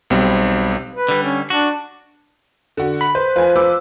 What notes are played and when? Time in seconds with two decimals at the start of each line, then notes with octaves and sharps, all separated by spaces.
0.10 B1 G3 C4
0.93 B4
1.09 D3 G3
1.22 C#4
1.50 D4 F#4
2.77 D3 F#4
3.01 B5
3.15 B4 C5
3.36 F3 B4 G#5
3.56 B4 D6 E6